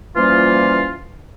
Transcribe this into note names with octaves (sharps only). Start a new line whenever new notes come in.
E3 F3 G3 A#3 C#4 F4